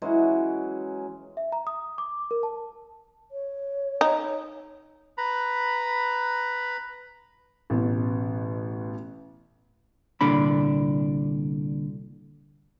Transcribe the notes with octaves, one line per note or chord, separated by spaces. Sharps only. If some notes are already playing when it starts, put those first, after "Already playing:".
E3 F#3 G#3 C#4
E5
A#5
D#6
D6
A#4
A5
C#5
D#4
B4 A#5 B5
A1 B2
C2 A#2 D3 D4 B5